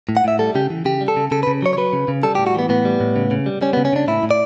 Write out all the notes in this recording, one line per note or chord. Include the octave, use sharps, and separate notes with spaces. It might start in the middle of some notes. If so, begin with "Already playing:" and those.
A2
F#5
A2 E5
G3 A4
C#3 G4
E3
C#3 G4
G3
A4
C#3
C#3 A4
B4
C#3
F#3 C#5
C#5
F#3 B4
C#3
C#3
G3 A4
G4
A2
F#4
E3 B3
A2 B3
G3
A2
C#3
C#3
G3
G3 C#4
B3
C#3
C#4
C#3 D4
A2 E4
A2
D5